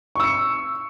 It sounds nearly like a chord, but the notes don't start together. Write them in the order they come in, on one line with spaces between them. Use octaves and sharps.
C#6 E6 C#7